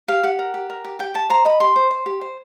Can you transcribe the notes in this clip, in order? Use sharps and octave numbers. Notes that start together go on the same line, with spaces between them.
G4 F5
G4 F#5
A#4
G4
A#4
G4
G4 G5
G4 A5
C5 A#5
D#5 B5
G4 C6
C5
C5
G4
C5